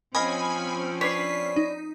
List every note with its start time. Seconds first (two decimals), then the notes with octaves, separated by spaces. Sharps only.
0.15 F3 C4 C#4 D#5 F5 G#5 B5
1.01 D4 B4 C#5 B6 C7
1.56 D#4